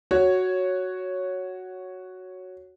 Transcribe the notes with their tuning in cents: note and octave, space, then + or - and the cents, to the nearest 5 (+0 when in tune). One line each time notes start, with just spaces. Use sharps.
F#4 +0 C#5 +0